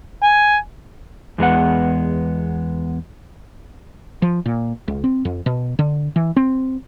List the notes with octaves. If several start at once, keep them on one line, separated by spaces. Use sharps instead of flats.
G#5
E2 G#3 B3 F#5
F3
A#2
C#2
C4
F2
B2
D3
E3
C4